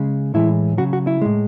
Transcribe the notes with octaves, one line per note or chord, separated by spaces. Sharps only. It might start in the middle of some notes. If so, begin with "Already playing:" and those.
Already playing: C#3 G#3
A2 E3 G#3 E4
C#3 F#3 F#4
F#4
E4
A2 G#3